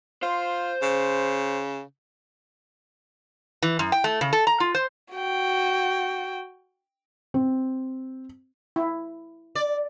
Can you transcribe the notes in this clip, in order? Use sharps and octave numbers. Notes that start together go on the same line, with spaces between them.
F4 C5
C#3
E3
F#2
G5
A3
C#3
A4
A#5
F4
C5
F#4 G5
C4
E4
D5